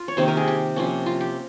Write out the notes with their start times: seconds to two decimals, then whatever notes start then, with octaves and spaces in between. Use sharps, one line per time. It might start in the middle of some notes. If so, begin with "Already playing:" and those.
Already playing: F4
0.08 C#5
0.17 C3 D#3 A#3 C5
0.28 A#4
0.37 G#4
0.48 G4
0.76 C3 F3 A#3 C#4
1.06 F4
1.21 G4